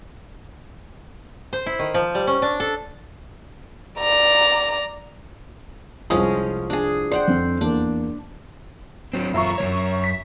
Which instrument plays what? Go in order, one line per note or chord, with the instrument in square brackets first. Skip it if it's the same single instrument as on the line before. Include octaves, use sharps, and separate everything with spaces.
[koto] C5
E4
D#3
F3
G3
C#4
D4
A4
[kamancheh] D5 A#5
[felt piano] C2 C5 D#6 [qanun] F3 G#3 C#4
[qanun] D4 G#4
[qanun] C5 F#5 G5 [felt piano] D5
[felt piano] F2 F3 C4
[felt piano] E2 A#3 [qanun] D4
[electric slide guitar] F#3 C4
[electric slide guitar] F#2 F4 [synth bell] E5 A#5 C#6
[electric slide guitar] F#2 F3 C#5
[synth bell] B6